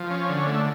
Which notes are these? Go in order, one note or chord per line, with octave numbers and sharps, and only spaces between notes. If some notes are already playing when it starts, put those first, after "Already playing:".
Already playing: F3
C#4
D3
A3